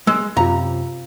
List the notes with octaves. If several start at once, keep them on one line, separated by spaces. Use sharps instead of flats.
G#3 E6
F#2 C3 F4 F5 A#5